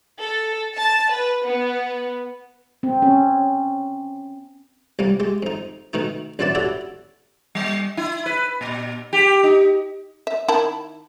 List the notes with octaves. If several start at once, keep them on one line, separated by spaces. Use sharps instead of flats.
A4
A5
B4
B3
C4
C#4
C2 G3 A#3
G#3 G4
F2 D#4
B2 D#3 A3 D#4
A#1 F#2 E3 B3 D5 A5
E4 F#4 G4 A4 C#5 D5
G3
E4
B4
A#2
G4
D#4
E5
D#3 E4 A5